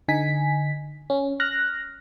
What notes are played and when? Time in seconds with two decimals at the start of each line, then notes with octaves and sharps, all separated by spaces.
0.08 D3 D#4 G#5 B6
1.10 C#4
1.40 F6 F#6 A#6